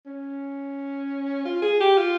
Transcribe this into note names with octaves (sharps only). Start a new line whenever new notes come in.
C#4
F4
G#4
G4
F4